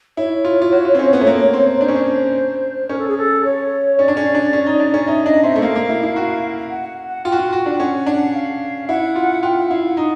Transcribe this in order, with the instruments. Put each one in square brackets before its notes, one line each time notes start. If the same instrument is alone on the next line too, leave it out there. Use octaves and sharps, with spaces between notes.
[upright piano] E4 [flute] C#5
[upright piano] F4
F4
F#4
F4
C4
C#4
B3
A3
A#3
C4
[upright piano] D4 [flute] C5
[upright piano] C#4
D4
[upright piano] C#4 [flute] A#4
[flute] A4
G#4
A4
C#5
[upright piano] C#4 [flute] D5
[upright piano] D4
C#4
D4
C#4
D#4
D4
C#4
[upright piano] D#4 [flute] E5
[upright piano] D4 [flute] D#5
[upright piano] C4 [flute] E5
[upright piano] A3
[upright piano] A#3 [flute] F5
[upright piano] A#3
E4
E4
F#4
[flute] F#5
F#5
F#5
[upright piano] F4 [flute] G5
[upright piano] F#4
F4
F#4
D4
[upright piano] C#4 [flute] F#5
[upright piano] D4
[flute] F5
[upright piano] E4 [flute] F#5
[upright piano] F4
[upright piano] F4 [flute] G5
[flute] F#5
[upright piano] E4 [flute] F5
[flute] F#5
[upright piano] D#4